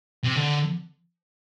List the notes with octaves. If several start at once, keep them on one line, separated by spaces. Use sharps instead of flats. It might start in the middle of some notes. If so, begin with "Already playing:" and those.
C3
D3